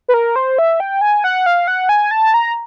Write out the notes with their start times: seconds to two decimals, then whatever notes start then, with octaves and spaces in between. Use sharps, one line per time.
0.09 B4
0.14 A#4
0.36 C5
0.59 E5
0.80 G5
1.01 G#5
1.24 F#5
1.46 F5
1.68 F#5
1.89 G#5
2.11 A5
2.34 A#5